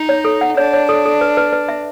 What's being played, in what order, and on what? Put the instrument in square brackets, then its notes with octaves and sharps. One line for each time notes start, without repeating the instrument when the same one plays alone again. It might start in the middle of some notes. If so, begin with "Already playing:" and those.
Already playing: [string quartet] D#4
[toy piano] C#5
A4
F#5
[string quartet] D4 [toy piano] C#5
[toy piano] C#5
A4
A4
B4
B4
B4
E5